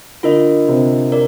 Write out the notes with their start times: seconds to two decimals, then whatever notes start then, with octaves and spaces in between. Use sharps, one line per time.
0.23 D3 F4 A#4 D#5
0.68 C3
1.12 A#4 D5